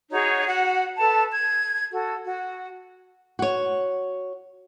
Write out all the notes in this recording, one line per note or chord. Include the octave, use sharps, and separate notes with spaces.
D#4 F#4 G#4 C#5
F#4 F#5
A4 B4 A5
G#6
F#4 A4
F#4
F#4 C#5